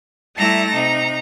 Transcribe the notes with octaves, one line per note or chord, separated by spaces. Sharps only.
G3 A3 E4 A5 A#5 A#6
C3 D#4 A#5